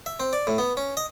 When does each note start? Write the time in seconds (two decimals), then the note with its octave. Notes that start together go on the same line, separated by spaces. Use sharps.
0.06 E5
0.20 C4
0.33 D5
0.47 A2
0.58 B3
0.77 C#4
0.97 D#5